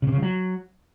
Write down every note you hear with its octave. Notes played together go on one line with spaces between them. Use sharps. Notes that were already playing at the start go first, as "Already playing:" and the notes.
C#3
C3
C#3
F3
F#3